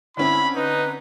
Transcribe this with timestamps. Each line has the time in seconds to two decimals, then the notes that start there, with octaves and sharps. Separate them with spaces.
0.17 D3 C4 C#4 E4 B5
0.55 D#4 B4